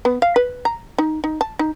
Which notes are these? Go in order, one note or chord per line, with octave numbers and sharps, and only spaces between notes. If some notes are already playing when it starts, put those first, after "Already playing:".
B3
F5
B4
A#5
D#4
D#4
A5
D#4